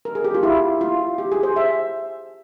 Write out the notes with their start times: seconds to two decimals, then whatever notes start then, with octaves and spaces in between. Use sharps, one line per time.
0.05 A#4
0.15 G#4
0.24 G4
0.34 F4
0.43 E4
0.81 F4
1.18 G4
1.32 G#4
1.43 C5
1.56 E5